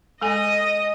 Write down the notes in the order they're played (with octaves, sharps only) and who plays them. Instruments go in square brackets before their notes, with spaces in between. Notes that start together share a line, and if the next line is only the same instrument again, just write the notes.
[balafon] G#3 A4 G#5 [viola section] D#5